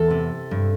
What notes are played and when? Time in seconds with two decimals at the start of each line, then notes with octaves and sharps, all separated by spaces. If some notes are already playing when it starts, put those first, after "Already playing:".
Already playing: E2 A4
0.10 C3
0.51 G2